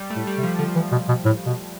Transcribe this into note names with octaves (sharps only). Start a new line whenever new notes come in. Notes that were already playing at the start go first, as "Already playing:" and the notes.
Already playing: G3
A3
A2
G3
C3
F3
D3 F3
E3
B2
B2
A2
B2